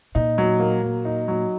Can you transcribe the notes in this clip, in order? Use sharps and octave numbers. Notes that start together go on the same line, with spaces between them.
A#2 D#4
F#3
A#3
F#3
D#4
F#3